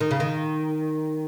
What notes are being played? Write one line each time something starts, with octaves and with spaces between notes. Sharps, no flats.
D#3
C#3
D#3